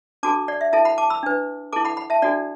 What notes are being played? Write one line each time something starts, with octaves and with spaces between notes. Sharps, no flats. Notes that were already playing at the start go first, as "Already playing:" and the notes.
D4 F#4 A4 A5 D6
D5 F#5
E5
E4 A4 E5 A5
F#5 B5
A5 D6
B5 E6
D4 B4
E4 A4 A5 D6
F#5 B5
F#5 B5
E5 A5
D4 F#4 A4 D5 F#5